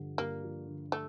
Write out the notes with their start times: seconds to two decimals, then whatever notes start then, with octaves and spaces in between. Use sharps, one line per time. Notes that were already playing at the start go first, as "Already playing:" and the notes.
Already playing: G2 D3 F3
0.18 G2 A#3
0.44 F3
0.68 D3
0.92 A3